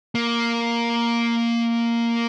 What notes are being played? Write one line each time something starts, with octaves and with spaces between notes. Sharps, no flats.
A#3